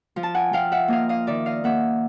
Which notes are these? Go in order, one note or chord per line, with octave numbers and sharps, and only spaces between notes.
F3
A5
F#5 G#5
F3 F5 G5
E5 F#5
A#3 D#5 F5
D#5 F5
D#3 D5 E5
D#5 F5
A#3 E5 F#5